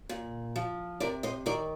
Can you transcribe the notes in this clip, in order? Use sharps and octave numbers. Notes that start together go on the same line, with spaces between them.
A#2
F3
C3 A#4 D5
C5 D#5
D#3 A#4 D5